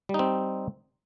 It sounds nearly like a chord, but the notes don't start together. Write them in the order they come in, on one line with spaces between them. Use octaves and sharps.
G3 D#4 C4